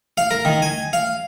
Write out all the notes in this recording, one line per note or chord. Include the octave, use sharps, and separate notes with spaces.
F5
A#4
D#3
G#5
F5